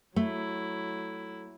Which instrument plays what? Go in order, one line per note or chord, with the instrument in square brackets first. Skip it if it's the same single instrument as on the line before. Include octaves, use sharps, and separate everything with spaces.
[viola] F#3 E4 [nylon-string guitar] A3